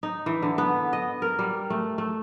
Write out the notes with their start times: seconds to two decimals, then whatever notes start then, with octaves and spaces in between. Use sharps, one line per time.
0.03 D#4
0.26 E3
0.42 D3
0.58 B3
0.93 D#5
1.22 A#4
1.39 G3
1.70 A3
1.98 A3